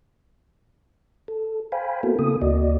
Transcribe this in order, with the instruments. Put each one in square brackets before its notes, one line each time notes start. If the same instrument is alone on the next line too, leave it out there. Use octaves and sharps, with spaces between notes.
[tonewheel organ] A4
C5 F5 G5 G#5 B5
A#3 B3 E4 F#4 A4 A#4
C#3 A#3 C4 A4 D#6
D2 A#3 F#4 D5 D#5